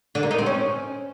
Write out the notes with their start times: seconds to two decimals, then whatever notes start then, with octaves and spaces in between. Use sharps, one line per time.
0.15 D3
0.23 A#3
0.31 D#4
0.39 C4
0.46 C#4